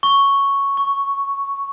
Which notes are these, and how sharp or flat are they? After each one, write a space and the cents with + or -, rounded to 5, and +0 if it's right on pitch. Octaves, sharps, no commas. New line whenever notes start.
C#6 +0
C#6 +15